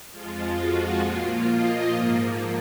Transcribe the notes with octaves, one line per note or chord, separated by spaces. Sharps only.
F2 F3 G#3 F4
F#4
A#2 F3 A#3 F4
D#5
G#2 F3 A#3